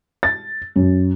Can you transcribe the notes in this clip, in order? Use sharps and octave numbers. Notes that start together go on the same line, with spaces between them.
A6
F#2